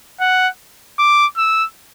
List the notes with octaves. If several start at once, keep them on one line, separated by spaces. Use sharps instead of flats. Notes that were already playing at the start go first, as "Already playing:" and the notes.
F#5
D6
E6